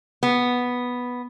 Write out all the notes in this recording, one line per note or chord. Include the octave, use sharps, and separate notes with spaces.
B3